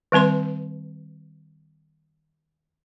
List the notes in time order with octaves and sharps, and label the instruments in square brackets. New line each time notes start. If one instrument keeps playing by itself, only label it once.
[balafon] D#3 G3 C4 B4 C6